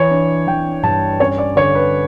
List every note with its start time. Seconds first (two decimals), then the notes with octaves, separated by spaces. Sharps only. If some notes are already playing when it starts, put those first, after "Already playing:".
Already playing: E3 C#5
0.11 D4
0.47 E3 G5
0.83 G2 A5
1.20 C#4 C#5
1.38 D5
1.56 D3 C#5
1.75 B4